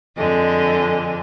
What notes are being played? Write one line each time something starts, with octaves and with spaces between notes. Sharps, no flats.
F2 D3 G#3 D#5